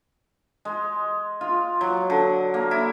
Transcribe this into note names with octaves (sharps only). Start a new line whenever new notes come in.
G#3
F4
F#3
D3
A#3
E4